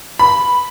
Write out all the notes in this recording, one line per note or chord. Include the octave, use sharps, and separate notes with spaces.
B5